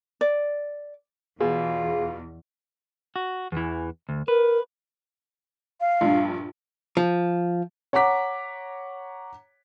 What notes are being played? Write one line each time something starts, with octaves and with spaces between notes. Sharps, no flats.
D5
E2 B2 F4 G#4
F#4
E2 E3
D2
A#4 B4
F5
A#1 G2
F3
C#5 F#5 A#5 D6 B6